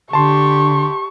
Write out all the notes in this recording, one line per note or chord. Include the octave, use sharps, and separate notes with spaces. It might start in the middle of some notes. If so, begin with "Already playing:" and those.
D3 G4 A5 C6 C#6